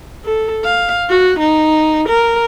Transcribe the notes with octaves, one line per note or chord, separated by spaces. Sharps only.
A4
F5
F#4
D#4
A#4